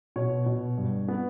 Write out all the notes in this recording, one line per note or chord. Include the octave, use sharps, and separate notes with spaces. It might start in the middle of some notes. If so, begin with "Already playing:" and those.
B2 C#5
B2
G2
B3